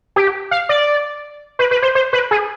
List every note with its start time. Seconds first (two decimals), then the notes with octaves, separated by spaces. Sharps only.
0.16 G4
0.51 F5
0.69 D5
1.59 B4
1.71 B4
1.82 C5
1.95 C5
2.13 B4
2.31 G#4